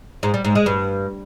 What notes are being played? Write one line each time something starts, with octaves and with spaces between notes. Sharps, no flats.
G#2
G3
G#2
G#3
G2